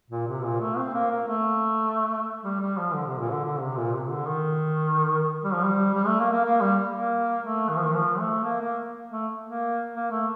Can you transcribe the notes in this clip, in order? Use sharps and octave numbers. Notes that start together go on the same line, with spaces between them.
A#2
C3
A#2
A3
C4
A#3
A#3
A3
G3
G3
F3
D3
C3
A#2
D3
D3
C3
A#2
C3
D3
D#3
G3
F3
G3
G3
A3
A#3
A#3
A#3
G3
A#3
A3
D#3
F3
D#3
F3
A3
A#3
A#3
A3
A#3
A#3
A3